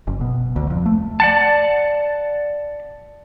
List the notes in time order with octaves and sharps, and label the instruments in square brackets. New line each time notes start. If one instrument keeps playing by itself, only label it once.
[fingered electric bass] F#1
B2
D2
F2
A3
[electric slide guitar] D5 F#5 A5